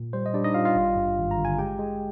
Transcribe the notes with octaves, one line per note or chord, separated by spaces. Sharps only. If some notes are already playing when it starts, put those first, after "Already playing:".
Already playing: A#2
G3 C5
D#5
G3 D4 D5
D#4 D#5
G3 F4 F5
F4 F5
G#1
G2
G#1
A#5
D3
G#5
G#3 G4 G5
G#3